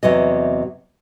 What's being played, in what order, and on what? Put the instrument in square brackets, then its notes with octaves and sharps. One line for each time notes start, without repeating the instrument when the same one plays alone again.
[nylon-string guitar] E2 C3 F#3 D#5